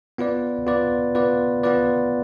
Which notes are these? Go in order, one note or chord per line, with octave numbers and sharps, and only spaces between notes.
B3 F4 B4 D5
B3 F4 B4 D5
B3 F4 B4 D5
B3 F4 B4 D5